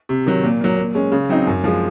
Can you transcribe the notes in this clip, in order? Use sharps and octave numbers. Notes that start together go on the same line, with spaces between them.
C3
D#3 F#3
A#2
F#3 A#3
A#2
G#3 C#4
C#3
F#3 C4 D#4
F#2
F3 G#3